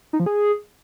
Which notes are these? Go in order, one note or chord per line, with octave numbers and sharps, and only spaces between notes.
D#4
F3
G#4